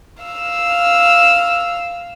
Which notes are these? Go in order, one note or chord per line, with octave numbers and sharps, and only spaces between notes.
F5 E6